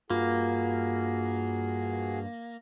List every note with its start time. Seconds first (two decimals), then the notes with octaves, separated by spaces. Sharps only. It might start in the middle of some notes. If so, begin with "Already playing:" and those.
0.10 G2 A#3 F4 F#4 G#4